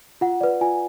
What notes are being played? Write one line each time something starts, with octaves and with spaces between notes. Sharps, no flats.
F4 F#5
B4 D5
F4 G#5